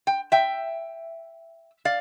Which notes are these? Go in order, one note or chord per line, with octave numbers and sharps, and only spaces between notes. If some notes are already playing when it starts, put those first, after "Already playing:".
G5
E5 G5
D5 F5